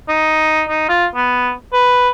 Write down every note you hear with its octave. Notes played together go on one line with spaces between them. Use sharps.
D#4
D#4
F4
B3
B4